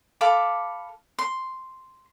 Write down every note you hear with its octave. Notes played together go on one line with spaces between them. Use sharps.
A4 F5 B5 D6
C6